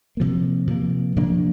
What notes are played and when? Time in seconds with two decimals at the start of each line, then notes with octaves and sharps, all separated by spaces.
0.17 C3 F3 A#3
0.67 C3 F3 A#3
1.16 C3 F3 A#3 D4